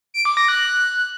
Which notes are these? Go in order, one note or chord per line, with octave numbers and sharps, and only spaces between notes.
D7
D6
A#6
F#6